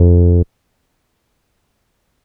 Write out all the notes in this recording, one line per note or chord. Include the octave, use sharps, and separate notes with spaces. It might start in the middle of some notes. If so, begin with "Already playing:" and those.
Already playing: F2